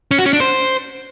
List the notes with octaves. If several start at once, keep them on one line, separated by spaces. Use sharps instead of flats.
C#4
F#4
C#4
D4
C5